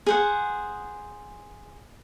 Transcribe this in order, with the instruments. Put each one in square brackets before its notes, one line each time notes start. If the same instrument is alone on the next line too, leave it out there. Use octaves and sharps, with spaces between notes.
[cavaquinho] G#4 C5 F#5